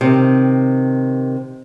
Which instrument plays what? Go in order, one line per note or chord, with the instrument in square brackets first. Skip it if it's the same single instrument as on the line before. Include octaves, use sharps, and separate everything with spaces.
[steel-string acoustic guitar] C3 D#3